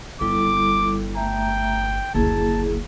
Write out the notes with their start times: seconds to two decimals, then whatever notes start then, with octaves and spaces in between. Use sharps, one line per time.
0.21 G1 G3 E4 A4 D6
1.15 A3 E5 G5 A#5
2.14 F#1 D2 A#3 E4 G#4 A5